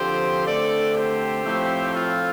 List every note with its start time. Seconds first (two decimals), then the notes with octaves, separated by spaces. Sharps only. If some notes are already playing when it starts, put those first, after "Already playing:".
Already playing: D3 F3 C4 G4 C5
0.47 D3 A3 C4 A4 D5
0.96 G4 C5
1.45 A2 F3 A3 C4
1.94 F4